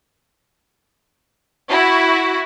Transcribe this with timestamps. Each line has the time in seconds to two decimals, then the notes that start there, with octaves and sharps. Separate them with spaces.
1.70 E4 F#4